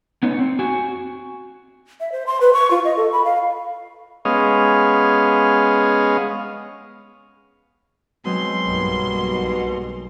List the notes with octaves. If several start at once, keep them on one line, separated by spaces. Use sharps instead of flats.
B3 C#4 D#4
C4
F#4 G#5
E5
C5
C6
B4
C#6
F4
D#5
A4
B5
F5
G#3 B3 C#4 D#5 F5
B2 F#3 G#3 C4 C6
B1 G2 A#3